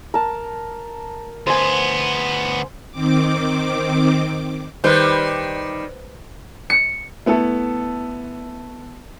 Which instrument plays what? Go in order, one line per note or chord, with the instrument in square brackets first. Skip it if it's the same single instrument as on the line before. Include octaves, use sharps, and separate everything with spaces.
[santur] A#4 A5
[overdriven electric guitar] D2 B3 [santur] C5 G#5
[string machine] D#3 C4 D6
[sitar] D#3 G3 [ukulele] B4 C5
[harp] C#7
[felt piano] A3 B3 E4 A4